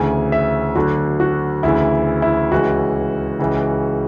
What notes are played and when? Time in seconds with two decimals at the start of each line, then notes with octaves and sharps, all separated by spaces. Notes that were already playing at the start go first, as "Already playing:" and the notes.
Already playing: D2 C#3 E3 G#5
0.32 E5
0.75 D2 D3 F#3 F#4
1.20 F#4
1.63 D2 C#3 E3 E4
2.22 E4
2.52 C#2 C#3 E3 F#4
3.40 C#2 C#3 E3